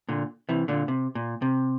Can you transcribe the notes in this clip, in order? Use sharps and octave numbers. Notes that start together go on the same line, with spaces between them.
A#2 D3
C3 E3
A#2 D3
C3
A#2
C3